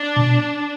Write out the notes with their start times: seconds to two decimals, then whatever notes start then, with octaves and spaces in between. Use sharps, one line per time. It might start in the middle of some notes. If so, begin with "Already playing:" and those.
Already playing: D4
0.16 B2